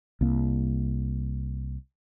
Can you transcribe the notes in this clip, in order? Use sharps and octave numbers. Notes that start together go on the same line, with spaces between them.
C2 A#3